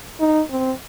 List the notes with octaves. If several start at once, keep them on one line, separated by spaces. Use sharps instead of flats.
D#4
C4